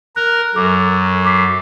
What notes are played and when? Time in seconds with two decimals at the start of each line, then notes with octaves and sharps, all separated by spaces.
0.16 A#4 F#6
0.55 F#2 A4 D6
1.25 D6 B6 C7